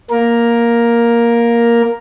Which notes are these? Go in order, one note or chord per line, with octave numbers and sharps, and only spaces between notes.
A#3 A#4